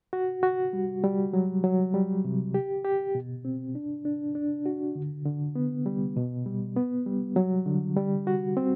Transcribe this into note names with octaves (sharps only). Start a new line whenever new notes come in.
F#4
F#4
G3
G3
F#3
F#3
G3
C3
G4
G4
B2
C4
D4
D4
D4
F#4
D3
D3
B3
G3
B2
G3
B3
G3
F#3
D3
G3
F#4
C4